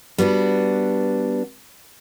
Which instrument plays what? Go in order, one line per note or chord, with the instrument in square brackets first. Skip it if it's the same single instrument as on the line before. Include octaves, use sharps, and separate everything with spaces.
[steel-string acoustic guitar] G3 B3 D4 F#4